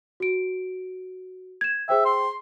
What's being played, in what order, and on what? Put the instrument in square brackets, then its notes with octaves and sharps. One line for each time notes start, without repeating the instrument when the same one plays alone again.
[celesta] F#4 D7
G#6 E7
[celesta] G#4 C5 G5 [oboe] E5
[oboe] C6